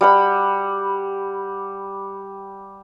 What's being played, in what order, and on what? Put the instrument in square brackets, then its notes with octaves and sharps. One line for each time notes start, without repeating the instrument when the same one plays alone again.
[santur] G3 F#5 B5